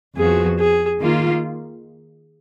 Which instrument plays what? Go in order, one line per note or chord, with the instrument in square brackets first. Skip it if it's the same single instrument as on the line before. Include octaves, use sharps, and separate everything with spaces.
[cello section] F2 F3 B3 F#4 [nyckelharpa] G#4
[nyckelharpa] G#4
[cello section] D#3 A#3 F4